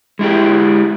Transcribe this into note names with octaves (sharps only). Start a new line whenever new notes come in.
G#3 E4 G4